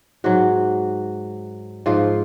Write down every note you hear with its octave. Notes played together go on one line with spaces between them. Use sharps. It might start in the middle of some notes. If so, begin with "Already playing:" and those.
G#2 F#3 F#4
G#2 F3 F4